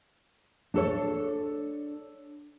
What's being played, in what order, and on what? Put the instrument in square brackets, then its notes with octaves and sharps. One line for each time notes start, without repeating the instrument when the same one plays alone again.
[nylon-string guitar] D4 A4 C#5